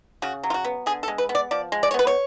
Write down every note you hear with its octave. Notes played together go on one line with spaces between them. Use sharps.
C#3 F#4
F#3
F4
F#4
B3
D3 G#4
A4
G#3
B4
B3
D5
F3 D5
G#3
D5
C#5
B3
B4
C#5